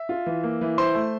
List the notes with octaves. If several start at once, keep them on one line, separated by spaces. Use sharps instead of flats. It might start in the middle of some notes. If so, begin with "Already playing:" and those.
Already playing: E5
F4
E3
A#3
E3
E4 C5 C6
A3